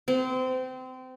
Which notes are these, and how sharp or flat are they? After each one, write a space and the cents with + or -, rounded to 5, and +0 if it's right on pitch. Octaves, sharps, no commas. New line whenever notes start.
C4 -25